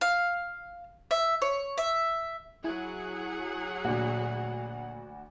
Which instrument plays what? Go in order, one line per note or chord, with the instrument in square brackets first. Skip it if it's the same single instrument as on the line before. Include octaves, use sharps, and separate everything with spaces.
[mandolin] F5
E5
C#5
E5
[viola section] F#3 G#4 F#5 [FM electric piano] E4 G#5
[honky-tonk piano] D2 D4 F#4 [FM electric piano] A#2